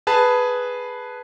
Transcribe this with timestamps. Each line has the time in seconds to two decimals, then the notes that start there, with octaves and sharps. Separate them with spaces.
0.07 G#4 B4 A5